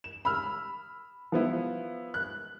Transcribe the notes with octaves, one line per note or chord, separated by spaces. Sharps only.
E7
B5 E6 F6
F3 B3 E4
F#6